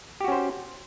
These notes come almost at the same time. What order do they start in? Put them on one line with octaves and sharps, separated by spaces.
G4 F#4 C#4 C5